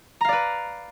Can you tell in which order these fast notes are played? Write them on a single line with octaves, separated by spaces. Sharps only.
A#5 F5 D5 B4